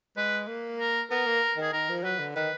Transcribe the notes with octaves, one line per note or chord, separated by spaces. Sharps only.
G#3 B4
A#3
A#4
B3 A#4
A#3
D#3
G#4
D#3 A#4
F3
F#3 B4
D3
D#3 B4